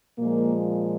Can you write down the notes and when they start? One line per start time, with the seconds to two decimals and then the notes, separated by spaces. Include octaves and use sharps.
0.18 A#2 F3 G#3 A#3